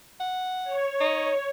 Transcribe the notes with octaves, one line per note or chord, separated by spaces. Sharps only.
F#5
C#5
D#4